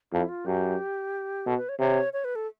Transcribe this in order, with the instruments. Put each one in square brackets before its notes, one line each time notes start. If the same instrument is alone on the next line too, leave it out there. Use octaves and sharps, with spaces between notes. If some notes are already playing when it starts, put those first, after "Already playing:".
[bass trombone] F2 [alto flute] E4
[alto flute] F4
[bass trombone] F#2 [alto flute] G4
[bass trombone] B2 [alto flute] A4
[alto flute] B4
C#5
[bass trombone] C3 [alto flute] C#5
[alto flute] C#5
B4
A4